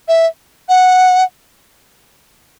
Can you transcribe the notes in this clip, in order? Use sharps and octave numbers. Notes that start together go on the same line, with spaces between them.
E5
F#5